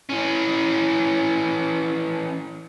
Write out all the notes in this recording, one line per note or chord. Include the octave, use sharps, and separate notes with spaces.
E3 C#4